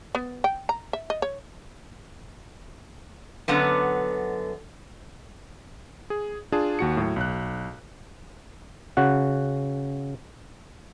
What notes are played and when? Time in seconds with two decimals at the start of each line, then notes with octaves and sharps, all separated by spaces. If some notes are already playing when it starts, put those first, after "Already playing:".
0.15 B3
0.44 G5
0.69 A#5
0.93 E5
1.10 D#5
1.22 C#5
3.48 F#2 D3 B3
6.10 G#4
6.52 D4 F4 G#4 A5
6.79 D#2 F#4 C#7
6.97 A2 F#3
7.16 B1 F#6
8.97 C#3 F#4 F#5